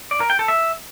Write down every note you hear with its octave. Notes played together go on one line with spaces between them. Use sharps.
D5
A#4
G5
A4
E5